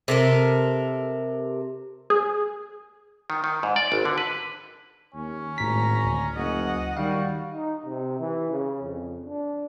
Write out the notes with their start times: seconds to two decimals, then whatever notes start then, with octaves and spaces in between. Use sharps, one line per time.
0.08 C3 A4 A#4
2.10 G#4
3.30 D#3
3.44 D#3
3.63 G#2
3.76 D5
3.92 G#1
4.05 D3
4.18 B4
5.14 D#2 C#4
5.58 G#1 A2 A#5 B6
6.04 D2
6.36 F#1 D#5 F#5
6.97 D#3 G3 F#4 F5
7.54 D#4
7.86 C3
8.20 E3
8.51 C#3
8.83 F2
9.26 D4